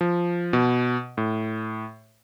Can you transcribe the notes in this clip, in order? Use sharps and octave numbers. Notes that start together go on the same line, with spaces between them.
F3
B2
A2